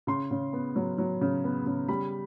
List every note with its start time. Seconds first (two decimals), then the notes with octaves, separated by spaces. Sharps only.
0.07 C#3 C6
0.31 C#3
0.53 B3
0.76 F#3
0.98 F#3
1.21 C#3
1.44 B3
1.66 C#3
1.88 G3 B5